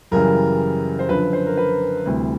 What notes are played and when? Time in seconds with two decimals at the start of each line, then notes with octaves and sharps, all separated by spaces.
0.12 F#2 C#3 E3 G3 A#4
0.99 C5
1.09 F#2 D3 F3 B4
1.33 C5
1.46 A#4
1.57 B4
2.06 D2 C3 E3 G3